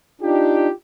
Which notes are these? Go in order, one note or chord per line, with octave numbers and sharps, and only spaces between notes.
D4 D#4 F4 G4